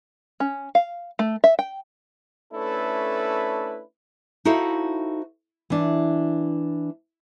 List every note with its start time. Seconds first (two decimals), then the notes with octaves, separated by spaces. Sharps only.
0.40 C#4
0.75 F5
1.19 A3
1.44 E5
1.59 G5
2.53 A3 C#4 D4 E4 A4 B4
4.45 D#4 E4 F#4 A4 C5 F5
5.70 E3 D4